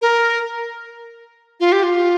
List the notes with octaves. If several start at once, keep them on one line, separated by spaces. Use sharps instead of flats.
A#4
F4
G4
F4